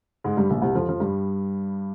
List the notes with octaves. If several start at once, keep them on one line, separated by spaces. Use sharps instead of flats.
G#2 G#3
G2 G3
A#1 A#2
C2 C3
F2 F3
F3
G2 G3